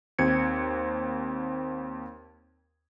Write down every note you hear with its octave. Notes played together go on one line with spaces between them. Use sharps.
D#2 C4 G#6 C#7